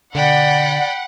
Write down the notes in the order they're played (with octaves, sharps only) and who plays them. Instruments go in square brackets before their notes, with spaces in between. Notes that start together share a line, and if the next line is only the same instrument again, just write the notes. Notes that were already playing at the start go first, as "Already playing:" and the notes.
[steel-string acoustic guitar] B2 D3 [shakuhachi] D5 [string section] F#5 [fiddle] G5 B5